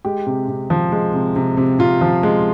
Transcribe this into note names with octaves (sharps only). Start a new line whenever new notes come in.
G#3 G4
C3
C3
F3
G#3
C3
C3
C3
C3 F4
F3
G#3